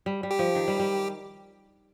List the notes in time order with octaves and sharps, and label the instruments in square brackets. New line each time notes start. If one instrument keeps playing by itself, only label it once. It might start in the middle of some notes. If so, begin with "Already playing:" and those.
[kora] G3
G3
[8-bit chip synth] G4
[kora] F3
D#3
G3
G3